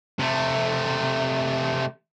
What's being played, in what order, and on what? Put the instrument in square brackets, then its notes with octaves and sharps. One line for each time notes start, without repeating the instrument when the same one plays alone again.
[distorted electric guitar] C3 A3